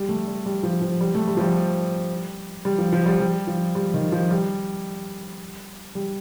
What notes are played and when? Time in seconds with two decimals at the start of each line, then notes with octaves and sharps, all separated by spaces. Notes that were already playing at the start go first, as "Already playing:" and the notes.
Already playing: G3
0.09 A3
0.27 G3
0.46 G3
0.63 F3
0.82 F3
1.01 G3
1.15 A3
1.27 G3
1.37 F3
1.41 G3
2.65 G3
2.78 F3
2.93 F3
3.06 G3
3.20 G3
3.47 F3
3.75 G3
3.94 D#3
4.12 F3
4.30 G3
5.95 G3